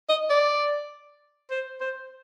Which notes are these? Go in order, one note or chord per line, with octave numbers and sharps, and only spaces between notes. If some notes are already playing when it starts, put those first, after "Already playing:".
D#5
D5
C5
C5